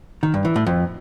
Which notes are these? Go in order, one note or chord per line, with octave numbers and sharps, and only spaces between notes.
D#3
G2
E3
A2
F2